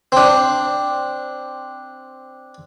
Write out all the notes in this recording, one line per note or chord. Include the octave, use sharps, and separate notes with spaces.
C4 D4